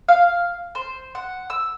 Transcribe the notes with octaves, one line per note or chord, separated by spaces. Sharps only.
F5
C5
F#5
E6